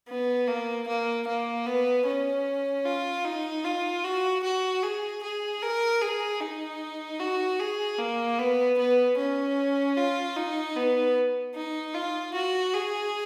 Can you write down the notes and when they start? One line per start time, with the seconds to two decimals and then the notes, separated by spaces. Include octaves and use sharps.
0.08 B3
0.48 A#3
0.87 A#3
1.27 A#3
1.66 B3
2.06 C#4
2.85 F4
3.25 D#4
3.65 F4
4.04 F#4
4.44 F#4
4.82 G#4
5.23 G#4
5.62 A#4
6.01 G#4
6.41 D#4
7.20 F#4
7.60 G#4
7.99 A#3
8.39 B3
8.78 B3
9.17 C#4
9.97 F4
10.36 D#4
10.76 B3
11.55 D#4
11.94 F4
12.34 F#4
12.73 G#4